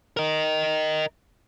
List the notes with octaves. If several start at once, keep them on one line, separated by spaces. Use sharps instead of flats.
A#4 D#5